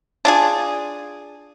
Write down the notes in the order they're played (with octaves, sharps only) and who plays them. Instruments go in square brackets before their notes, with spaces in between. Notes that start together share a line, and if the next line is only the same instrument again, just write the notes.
[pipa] D4 F4 G#4